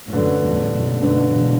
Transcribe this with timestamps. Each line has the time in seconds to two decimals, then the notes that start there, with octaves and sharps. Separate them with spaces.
0.08 A2
0.13 F#2 D3 A3 D4 B4
0.42 E2 A2
0.72 F#2 B2
1.01 F#2 B2 D3 A3 D4 B4
1.31 B2 E3